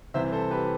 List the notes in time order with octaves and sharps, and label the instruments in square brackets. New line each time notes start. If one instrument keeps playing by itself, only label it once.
[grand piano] C2 C3 E3 C5 E5
A4 C5
G4 B4